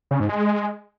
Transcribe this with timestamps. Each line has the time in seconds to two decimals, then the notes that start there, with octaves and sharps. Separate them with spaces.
0.11 C#3
0.20 G#2
0.29 G#3